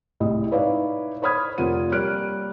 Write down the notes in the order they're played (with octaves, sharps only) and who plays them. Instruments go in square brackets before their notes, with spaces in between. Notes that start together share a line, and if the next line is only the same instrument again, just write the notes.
[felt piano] C2 A2 G#3 D#5
D#4 E4 B4 C#5 D5 F5
C5 C#5 B5 D#6 F6 G#6
F1 A#3 F4 F#5 D#7
G3 A#3 C#5 F6 F#6 D7